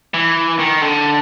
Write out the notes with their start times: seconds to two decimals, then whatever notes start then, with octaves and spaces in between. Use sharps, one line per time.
0.14 E3
0.59 D#3
0.82 D3